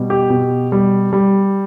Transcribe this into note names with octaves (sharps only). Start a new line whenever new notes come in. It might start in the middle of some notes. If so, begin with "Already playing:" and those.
Already playing: B2 G3
G4
B2
G3
G3